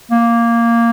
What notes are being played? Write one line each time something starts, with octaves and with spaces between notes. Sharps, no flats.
A#3